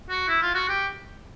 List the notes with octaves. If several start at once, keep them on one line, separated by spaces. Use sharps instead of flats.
F#4
E4
F4
F#4
G4